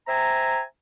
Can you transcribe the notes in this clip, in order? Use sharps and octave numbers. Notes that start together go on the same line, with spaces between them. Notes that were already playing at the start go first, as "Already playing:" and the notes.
C5 E5 G5 G#5 A#5